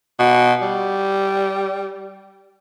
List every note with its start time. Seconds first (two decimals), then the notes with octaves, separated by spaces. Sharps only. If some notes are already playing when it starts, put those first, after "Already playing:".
0.19 B2
0.62 G3